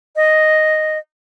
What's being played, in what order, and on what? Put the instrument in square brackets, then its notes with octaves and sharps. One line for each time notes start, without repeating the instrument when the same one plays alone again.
[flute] D#5